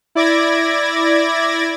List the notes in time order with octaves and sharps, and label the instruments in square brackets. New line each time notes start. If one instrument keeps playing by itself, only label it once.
[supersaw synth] E4 D5 D6 G#6 A#6